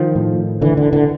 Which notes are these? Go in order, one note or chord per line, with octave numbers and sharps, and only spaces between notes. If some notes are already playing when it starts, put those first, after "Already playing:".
Already playing: D#3 F3
A2
D3 E3
D3
D3